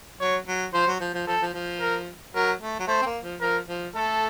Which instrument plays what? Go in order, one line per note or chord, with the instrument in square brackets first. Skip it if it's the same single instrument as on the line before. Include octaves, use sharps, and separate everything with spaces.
[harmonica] F#3 [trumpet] C#5
[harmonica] F#3
[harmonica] F3 [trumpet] C5
[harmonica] F#3
F3
F3
[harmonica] F3 [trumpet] A4
[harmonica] F3
F3
[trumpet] A#4
[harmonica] F#3 [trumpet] A#4
[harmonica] A3
F#3
[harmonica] A3 [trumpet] C5
[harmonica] C4
A#3
F3
[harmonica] F3 [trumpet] A#4
[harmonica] F3
[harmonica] A3 [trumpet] A4